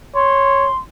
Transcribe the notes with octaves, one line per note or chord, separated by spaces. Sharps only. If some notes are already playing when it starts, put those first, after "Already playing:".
C#5 C6